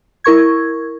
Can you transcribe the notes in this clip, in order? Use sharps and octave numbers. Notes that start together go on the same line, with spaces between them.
E4 A#4 C#6 G#6